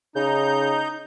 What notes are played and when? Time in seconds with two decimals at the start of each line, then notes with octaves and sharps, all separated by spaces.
0.16 C#3 D#4 G6